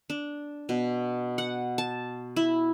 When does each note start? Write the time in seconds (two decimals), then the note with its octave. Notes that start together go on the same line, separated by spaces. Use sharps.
0.10 D4
0.69 B2
1.38 F#5
1.78 A5
2.36 E4